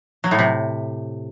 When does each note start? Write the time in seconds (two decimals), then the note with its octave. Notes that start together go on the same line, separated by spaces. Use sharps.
0.24 F#3
0.31 A2
0.39 C3